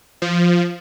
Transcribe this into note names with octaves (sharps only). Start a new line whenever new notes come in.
F3